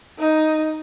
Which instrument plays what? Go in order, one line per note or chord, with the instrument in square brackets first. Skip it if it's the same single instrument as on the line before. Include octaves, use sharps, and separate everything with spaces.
[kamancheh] D#4